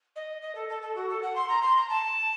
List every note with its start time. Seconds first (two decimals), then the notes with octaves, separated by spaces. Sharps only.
0.15 D#5
0.41 D#5
0.55 A4
0.69 A4
0.82 A4
0.95 F#4
1.09 A4
1.22 F#5
1.35 C6
1.48 A#5
1.61 C6
1.76 A#5
1.89 A5